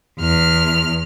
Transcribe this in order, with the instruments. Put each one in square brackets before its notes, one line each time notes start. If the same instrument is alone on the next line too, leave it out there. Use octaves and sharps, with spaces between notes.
[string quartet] E2 F6